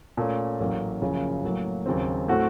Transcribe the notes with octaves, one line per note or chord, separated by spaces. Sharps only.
A#2 A3 C#4
A1 A2 F#3 A#3
F#1 F#2 C#3 F3
A2 F#3 A#3
D#2 C#3 F#3 C4
A2 A3 C4 F#4